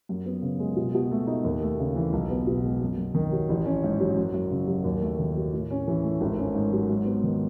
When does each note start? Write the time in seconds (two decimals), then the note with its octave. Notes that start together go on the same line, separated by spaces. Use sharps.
0.09 F#2
0.26 B3
0.42 C#3
0.59 G#3
0.76 B2
0.94 B2
1.11 A3
1.27 D#4
1.44 D#2
1.62 A3
1.79 C#3
1.96 E3
2.13 B1
2.30 B3
2.47 B2
2.64 G#3
2.81 F#2
2.97 F#2
3.14 D#3
3.32 F#3
3.49 A1
3.66 C#4
3.83 G#2
4.00 F#3
4.16 F#2
4.34 F#2
4.51 C#3
4.67 F#3
4.84 D#2
5.02 A3
5.19 D#3
5.36 F#3
5.53 A2
5.71 C#4
5.88 E3
6.04 A3
6.21 G#1
6.38 C#4
6.55 G#2
6.72 F#3
6.89 G#2
7.05 B3
7.24 D#3